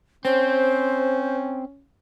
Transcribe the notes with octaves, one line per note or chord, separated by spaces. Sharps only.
C4 C#4 C5